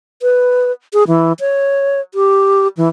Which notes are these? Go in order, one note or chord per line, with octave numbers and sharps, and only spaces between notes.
B4
G#4
E3
C#5
G4
E3